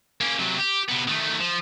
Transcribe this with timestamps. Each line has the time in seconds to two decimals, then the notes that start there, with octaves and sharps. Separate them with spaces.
0.21 A#3 C#4
0.39 C3 F#3
0.58 G4
0.89 C3 B3
1.08 D#3 A3
1.40 F3